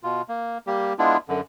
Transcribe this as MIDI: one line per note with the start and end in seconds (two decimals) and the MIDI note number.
0.03 0.22 47
0.03 0.22 65
0.29 0.58 58
0.67 0.93 55
0.67 0.93 58
0.67 0.93 67
0.99 1.17 56
0.99 1.17 59
0.99 1.17 62
0.99 1.17 64
0.99 1.17 65
1.29 1.41 42
1.29 1.41 50